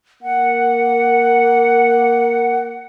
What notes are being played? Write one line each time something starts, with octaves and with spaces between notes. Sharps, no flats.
A#3 F#5